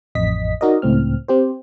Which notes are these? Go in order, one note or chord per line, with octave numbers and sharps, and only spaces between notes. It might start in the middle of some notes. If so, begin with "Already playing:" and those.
A1 F2 D#5 B6
D#4 F#4 A#4 D5 D#5
C#2 A2 C4 F6
C4 G4 C5